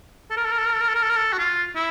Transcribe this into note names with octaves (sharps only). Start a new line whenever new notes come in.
A4
A#4
A4
A#4
A4
A#4
A4
A#4
A4
A#4
A4
A#4
A4
F#4
F4
E4